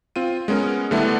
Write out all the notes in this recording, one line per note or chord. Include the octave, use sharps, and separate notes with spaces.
C4 F4 D#7
G#3 B3 C#4 A#4
D3 G3 A3 B3 D4 E4